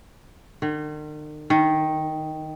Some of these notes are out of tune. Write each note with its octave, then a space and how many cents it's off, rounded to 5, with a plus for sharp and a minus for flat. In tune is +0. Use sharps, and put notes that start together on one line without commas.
D#3 -45
D#3 +5